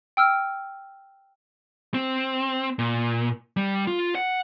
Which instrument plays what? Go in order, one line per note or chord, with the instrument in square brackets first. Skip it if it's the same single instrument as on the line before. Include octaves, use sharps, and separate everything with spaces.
[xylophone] G5 E6 F6
[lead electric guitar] C4
A#2
G3
F4
F#5